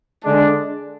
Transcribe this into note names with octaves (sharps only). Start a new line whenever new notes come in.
D3 G#3 D4